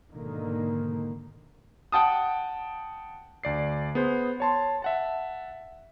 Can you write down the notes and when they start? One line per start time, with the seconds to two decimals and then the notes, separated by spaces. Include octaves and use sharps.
0.11 G#2 B2 D3 D#3 A#3
1.92 F#5 G5 A5 D#6
3.44 D2 D5 C7
3.95 B3 G#4 C5
4.40 C#5 A5 C6
4.82 E5 F#5 A5